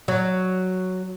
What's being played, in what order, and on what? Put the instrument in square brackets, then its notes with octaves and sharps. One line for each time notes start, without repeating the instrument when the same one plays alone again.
[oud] F#3